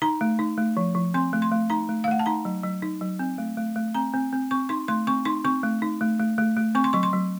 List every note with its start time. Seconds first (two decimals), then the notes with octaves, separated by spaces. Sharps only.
0.02 D#4 A#5
0.21 A3
0.39 D#4
0.58 A3
0.77 F3
0.95 F3
1.14 C4 C6
1.33 A3
1.42 C6
1.52 A3
1.70 D#4 A#5
1.89 A3
2.04 F5
2.08 A3 F#5
2.19 A5
2.26 D#4 A#5
2.45 F#3
2.63 F#3
2.82 D#4
3.01 F#3
3.19 C4
3.38 A3
3.57 A3
3.76 A3
3.94 C4 A#5
4.14 C4
4.33 C4
4.51 C4 C#6
4.69 D#4 C6
4.88 A3 C6
5.07 C4 C#6
5.25 D#4 C6
5.45 C4 C#6
5.63 A3
5.82 D#4
6.01 A3
6.19 A3
6.38 A3
6.57 A3
6.75 C4 C#6
6.84 C6
6.93 F#3 C#6
7.03 C6
7.13 F#3